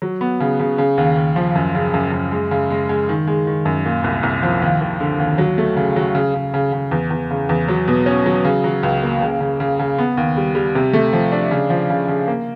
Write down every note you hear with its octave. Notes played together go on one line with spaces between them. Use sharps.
F#3
B3
C#3
C#3
C#3
D#2
D#2
F3
F#2
C#3
F#2
F#2
G#3
C#3
G#3
G#3
D#3
G#3
D#3
F#2
A#2
C2
C2
F3
D#2
D#2
D3
D#2
F#3
A3
C#3
F#3
C#3
C#3
C#3
C#3
E2
E2
C#3
E2
F#3
B2
C#4
F#3
C#3
F#3
C#2
A#3
C#3
C#3
C#3
C#3
B3
D#2
G3
G3
C3
A3
F3
D4
C#3
F3
C#3
C#3
A#3